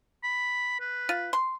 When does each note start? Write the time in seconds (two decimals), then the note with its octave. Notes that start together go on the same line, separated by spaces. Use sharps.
0.24 B5
0.80 B4
1.09 F4
1.33 C6